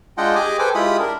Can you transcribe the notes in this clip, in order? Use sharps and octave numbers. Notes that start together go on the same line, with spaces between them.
G#3 D4 F4 D#5 F#5 G5
G4 G#4 D#5 G#5 D6
A4 B4 C5 G5 G#5 D6
G#3 E4 F4 G4 B5 D#6
D4 A#4